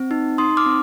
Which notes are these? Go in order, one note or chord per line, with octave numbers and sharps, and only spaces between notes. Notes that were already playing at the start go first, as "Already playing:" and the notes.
Already playing: C4
D#4
D#4 C6 D#6
D6 F6
C4